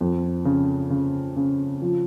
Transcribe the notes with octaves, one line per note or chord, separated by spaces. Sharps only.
F2
C#3
C#3
C#3
F3